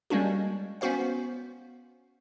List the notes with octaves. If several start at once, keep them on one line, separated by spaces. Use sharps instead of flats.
G3 G#3 A#3 C#4 D4 F#4
B3 C#4 F#4 C5 F5